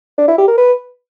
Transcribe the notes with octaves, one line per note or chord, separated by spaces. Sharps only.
D4
E4
G4
A#4
B4